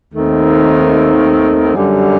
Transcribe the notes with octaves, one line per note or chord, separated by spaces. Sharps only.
D#2 D#3 A3 C4
F#2 D3 G3